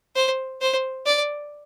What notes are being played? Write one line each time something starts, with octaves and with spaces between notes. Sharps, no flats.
C5
C5
D5